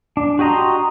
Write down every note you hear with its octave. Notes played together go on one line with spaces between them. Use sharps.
D4
F#4 G4 D#5 A#5 C6